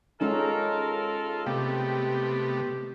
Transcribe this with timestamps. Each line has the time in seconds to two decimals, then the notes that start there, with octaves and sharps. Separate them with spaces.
0.21 G#3 C#4 D#4 F4 A4 A#4
1.46 C3 A3 B3 G4